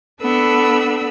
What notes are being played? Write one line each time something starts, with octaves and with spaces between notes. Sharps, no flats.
B3 D4 A4 B5 E6